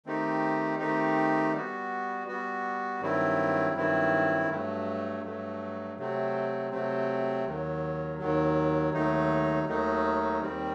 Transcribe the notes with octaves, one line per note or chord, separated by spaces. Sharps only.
D#3 A3 C4 D#4 G4
D#3 A3 C4 D#4 G4
G3 B3 F#4
G3 B3 F#4
G2 D#3 F#3 C4 E4
G2 D#3 F#3 C4 E4
G2 F#3 A3
G2 F#3 A3
C3 F#3 A3 C4
C3 F#3 A3 C4
D#2 D#3 F#3
D#2 D#3 F#3
D#2 D#3 F#3 A3 D#4
D#2 D#3 F#3 A3 D#4
D#2 D#3 G3 C4